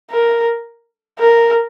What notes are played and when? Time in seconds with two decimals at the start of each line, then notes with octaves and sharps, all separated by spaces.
0.11 A#4
1.19 A#4